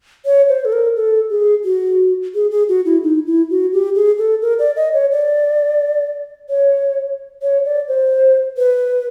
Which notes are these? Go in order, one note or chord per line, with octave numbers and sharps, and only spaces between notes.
C#5
C5
A4
A#4
A4
G#4
F#4
G#4
G#4
F#4
E4
D#4
E4
F#4
G4
G#4
A4
A#4
D5
D#5
C#5
D5
C#5
C#5
D5
C5
B4